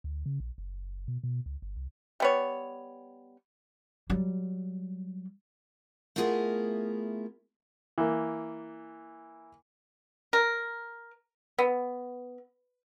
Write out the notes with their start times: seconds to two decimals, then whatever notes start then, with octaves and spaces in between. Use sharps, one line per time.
0.04 D2
0.26 C#3
0.40 A#1
0.58 F#1
1.08 B2
1.24 B2
1.46 C#2
1.62 G1
1.77 C2
2.20 G3 B3 C#5
4.10 F#3 G3
6.16 A3 B3 E4 F4 G#4 A#4
7.98 E3 A#3
10.33 A#4
11.58 B3